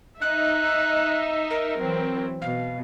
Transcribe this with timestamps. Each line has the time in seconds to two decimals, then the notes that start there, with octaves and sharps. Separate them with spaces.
0.21 D#4 E5 F#6
1.50 A#4
1.80 E3 F#3 C4
2.42 B2 F5